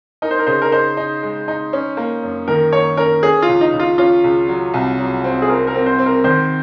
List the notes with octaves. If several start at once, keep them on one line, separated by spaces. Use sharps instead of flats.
D#4 A#4
C5
A#4
C#3 C5
A#4
D#4 C5
D#4
G#3
D#4
C#4
A#3
F#2
D#3 A#4
A#3 C#5
C#4 A#4
C#4 G#4
F4
C#2
D#4
C#2
F4
C#4 F4
C#2
F#3
C2
F#3
C4
G#4
C4 A#4
A#4
C4
C5
C4
A#4
D#3 C5